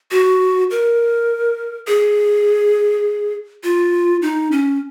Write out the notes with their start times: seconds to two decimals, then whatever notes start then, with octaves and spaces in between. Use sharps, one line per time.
0.11 F#4
0.71 A#4
1.87 G#4
3.64 F4
4.22 D#4
4.52 C#4